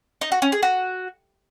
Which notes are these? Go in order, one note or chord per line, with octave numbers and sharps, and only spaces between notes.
D#4
F#4
C#4
G#4
F#4